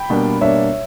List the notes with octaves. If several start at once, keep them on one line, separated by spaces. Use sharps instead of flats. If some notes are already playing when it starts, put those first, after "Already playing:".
Already playing: G5 B5
B2 G3 A#3 D4
B2 G3 A#3 D4 C#5 E5